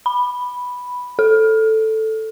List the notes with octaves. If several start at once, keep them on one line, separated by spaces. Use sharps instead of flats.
B5
A4